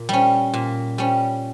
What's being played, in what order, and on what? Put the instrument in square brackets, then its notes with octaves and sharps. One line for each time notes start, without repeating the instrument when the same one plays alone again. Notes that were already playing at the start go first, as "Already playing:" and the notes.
Already playing: [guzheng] A#2
G3 C#4
A#2
G3 C#4